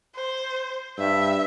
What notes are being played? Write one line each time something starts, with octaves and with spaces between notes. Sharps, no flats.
C5
G2 E5